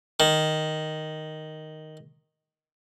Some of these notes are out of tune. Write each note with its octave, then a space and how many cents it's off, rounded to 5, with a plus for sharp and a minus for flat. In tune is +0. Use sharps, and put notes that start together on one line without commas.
D#3 +0